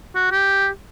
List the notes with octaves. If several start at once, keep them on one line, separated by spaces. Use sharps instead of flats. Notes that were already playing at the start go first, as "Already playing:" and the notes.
F#4
G4